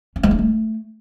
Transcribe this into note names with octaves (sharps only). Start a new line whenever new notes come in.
C#4
G#3
D4
A3